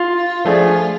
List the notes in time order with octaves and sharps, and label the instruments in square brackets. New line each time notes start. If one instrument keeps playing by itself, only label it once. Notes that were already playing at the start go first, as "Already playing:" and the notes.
Already playing: [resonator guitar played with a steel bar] F4
[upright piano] F3 A3 D4 G#4